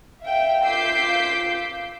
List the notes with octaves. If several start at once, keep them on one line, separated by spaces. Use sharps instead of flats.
E5 F5 G5
F4 D6 E6 G6 B6 C7